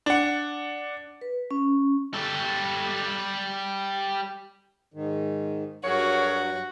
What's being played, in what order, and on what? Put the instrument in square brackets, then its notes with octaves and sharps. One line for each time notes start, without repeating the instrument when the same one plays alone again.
[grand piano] D4 F#5
[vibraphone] B4
C#4
[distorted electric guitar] G3 A4
[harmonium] G#2 D#3
[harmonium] G2 F#3 [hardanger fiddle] F#4 [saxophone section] G#4 A#4 C#5